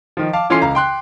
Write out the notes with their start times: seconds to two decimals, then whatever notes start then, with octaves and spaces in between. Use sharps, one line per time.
0.17 D#3 F3
0.33 F5 A5 D6
0.50 E3 C#4 F4 A4 C6 C7
0.62 C#2 F5 A#5
0.75 G5 C6 F#6